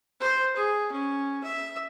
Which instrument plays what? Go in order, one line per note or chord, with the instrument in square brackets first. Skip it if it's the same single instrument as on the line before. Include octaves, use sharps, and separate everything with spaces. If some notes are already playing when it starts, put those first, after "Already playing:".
[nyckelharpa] C5
G#4
C#4
E5